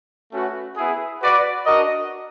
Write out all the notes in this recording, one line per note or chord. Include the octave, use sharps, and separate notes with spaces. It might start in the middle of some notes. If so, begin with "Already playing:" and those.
A3 C#4 F#4 B4
B3 E4 G#4
F#4 B4 D5 F#5
D4 F#4 A#4 D#5